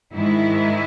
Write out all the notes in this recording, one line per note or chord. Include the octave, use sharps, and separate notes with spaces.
G#2 D#3 G#3 E4